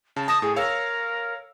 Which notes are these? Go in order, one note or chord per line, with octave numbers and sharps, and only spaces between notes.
C#3 A5
A5 D#6 A#6 E7
A2 G#4
A#4 C#5 F5 E6